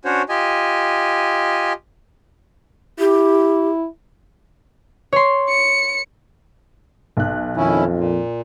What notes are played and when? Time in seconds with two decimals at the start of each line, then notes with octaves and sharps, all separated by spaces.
0.05 C#4 D4 F#4 C5 C#5
0.29 F4 G4 D#5 G#5
2.99 E4 G4
5.13 C#5 C6
5.49 C#7
7.17 B1 F#6
7.57 F2 D#3 C#4 E4
7.97 A#2